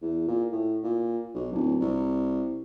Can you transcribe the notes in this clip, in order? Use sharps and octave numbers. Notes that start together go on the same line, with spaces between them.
E2
A#2
A2
A#2
B1
D1
C2